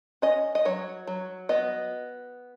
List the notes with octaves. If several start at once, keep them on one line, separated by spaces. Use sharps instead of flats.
C#4 D#5
D#5
F#3 C#5
F#3
B3 D#5